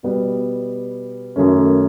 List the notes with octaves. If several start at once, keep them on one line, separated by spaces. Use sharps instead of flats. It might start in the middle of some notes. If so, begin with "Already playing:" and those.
B2 G3 B3
F#2 D#3 F#3 A3 C#4